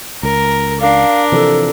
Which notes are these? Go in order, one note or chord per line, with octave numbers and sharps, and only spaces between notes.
C#2 A#4
D4 A#4 F5
C3 E3 F3 A4